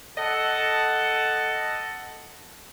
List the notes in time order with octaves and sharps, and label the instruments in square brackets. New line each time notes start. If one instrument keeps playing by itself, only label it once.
[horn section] A4 D#5 F#5 A5